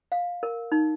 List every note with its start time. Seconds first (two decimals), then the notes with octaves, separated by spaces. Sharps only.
0.12 F5
0.43 A#4
0.72 D#4